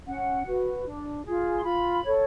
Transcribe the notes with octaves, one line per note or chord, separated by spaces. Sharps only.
C#4 F#5
F#4 B4
D4
F4 G#4
C6
F4 B5
A4 C#5